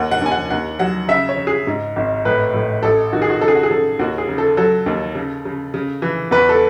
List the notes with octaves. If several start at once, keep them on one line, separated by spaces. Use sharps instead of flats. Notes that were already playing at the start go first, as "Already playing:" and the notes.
Already playing: D#2 F#5
F#5
D#2 G#5
F#5
D#2 F#5
F#3 F#5
C#3 E5
C#5
C#3
G#4
G#2
G#1
A2 B4
A2
A1 A4
D#3 F#4
G#4
F#4
C#3 A4
G#4
F#4
G#4
C#3 A4
D#2 F#4
G#4
C#3
A4
F#3 A4
D#2
C#3
C#3
C#3
E3
E2 B4
A4